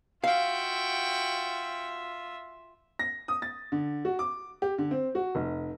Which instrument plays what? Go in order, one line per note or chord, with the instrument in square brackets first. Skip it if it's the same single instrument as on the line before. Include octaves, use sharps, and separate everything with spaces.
[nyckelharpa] F4 E5 [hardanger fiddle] F#4 G5 [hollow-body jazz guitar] F5
[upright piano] A#6
D#6
A6
D3
F#4
D6
G4
D3
C4
F#4
F1